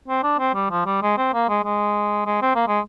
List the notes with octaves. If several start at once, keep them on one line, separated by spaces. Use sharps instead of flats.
C4
D4
C4
G3
F3
G3
G#3
C4
A#3
G#3
G#3
G#3
C4
A#3
G#3